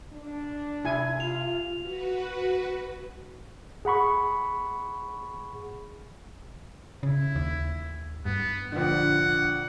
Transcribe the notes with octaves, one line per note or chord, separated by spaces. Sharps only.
D4
C3 E4 G#5
F4 F7
F#4 B4
G#4 F#5 B5 C#6
C#3 E4
D#2
G2 B3
A#1 D3 F#5